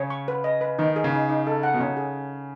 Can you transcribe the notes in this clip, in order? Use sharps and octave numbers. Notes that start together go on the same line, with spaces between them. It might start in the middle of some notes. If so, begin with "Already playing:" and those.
Already playing: C#3 C#5
C#6
B4
D#5
B4
D#3 D#4
G#4
C#3
D#4
D#4
A4
F#5
B2
C#3 C#4
G#4